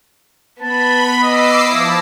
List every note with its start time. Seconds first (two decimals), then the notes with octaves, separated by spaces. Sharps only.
0.62 B3 B4 A5 B5
1.23 D#5 D6 E6 C7
1.70 F3 E4 A5 A#6